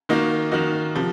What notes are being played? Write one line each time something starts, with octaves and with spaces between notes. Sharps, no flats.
D#3 A#3 D#4 F#4
D#3 A#3 D#4 F#4
C3 F3